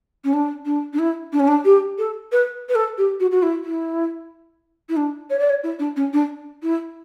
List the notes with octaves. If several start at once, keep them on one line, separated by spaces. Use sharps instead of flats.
C#4
D4
D4
D4
E4
D4
C#4
D4
G4
A4
B4
B4
A4
G4
F#4
F#4
E4
E4
E4
D4
C#5
D5
C#5
E4
D4
C#4
D4
E4